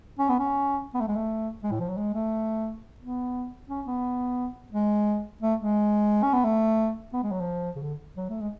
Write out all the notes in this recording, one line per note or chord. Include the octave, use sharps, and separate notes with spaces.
C#4
B3
C#4
B3
A3
G#3
A3
G#3
A2
F3
F#3
G#3
A3
B3
C#4
B3
G#3
A3
G#3
C#4
B3
A3
B3
G#3
F#3
F3
C#3
D3
F#3
A3
G#3